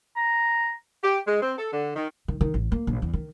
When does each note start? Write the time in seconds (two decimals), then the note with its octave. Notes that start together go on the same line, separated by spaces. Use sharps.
0.16 A#5
1.04 G4
1.27 G#3
1.42 C4
1.58 A4
1.73 D3
1.96 D#3
2.28 D#3
2.41 D#3
2.54 A1
2.72 A#3
2.87 A#1
3.02 E2
3.13 D#3